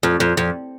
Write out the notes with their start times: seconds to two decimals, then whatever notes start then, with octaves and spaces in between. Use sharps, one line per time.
0.03 F2
0.20 F2
0.37 F2